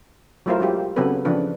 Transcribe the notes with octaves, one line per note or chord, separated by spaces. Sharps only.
F#3 A3 E4 F4 A#4 C5
F#3 G#3 F4 G4
C#3 F#3 B3 C4 A4 B4
C#3 E3 F3 D4 B4